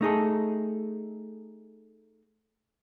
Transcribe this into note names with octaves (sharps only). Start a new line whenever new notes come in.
A3 D#4 G#4 A4